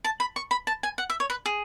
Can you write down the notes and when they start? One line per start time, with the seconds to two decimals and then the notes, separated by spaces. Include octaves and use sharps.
0.05 A5
0.20 B5
0.36 C#6
0.51 B5
0.67 A5
0.83 G#5
0.98 F#5
1.10 E5
1.20 C#5
1.30 B4
1.46 G#4